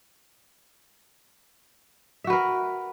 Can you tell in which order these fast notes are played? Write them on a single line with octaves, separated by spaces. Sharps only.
E5 F#4 B4 A#4